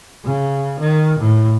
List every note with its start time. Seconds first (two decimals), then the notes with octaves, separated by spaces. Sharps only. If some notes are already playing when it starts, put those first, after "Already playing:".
0.25 C#3
0.80 D#3
1.19 A2